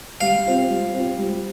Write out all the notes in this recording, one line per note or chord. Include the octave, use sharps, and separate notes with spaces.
G3 F5
C4 F4
G3
C4 F4
G3